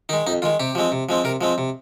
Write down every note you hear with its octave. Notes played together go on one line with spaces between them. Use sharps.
D#3 G#3 D#4
F2 D#4
D#3 G#3 F4
C3 G4
F3 G#3 C4
C3
F3 G#3 C4
C3 A#4
F3 G#3 C4
C3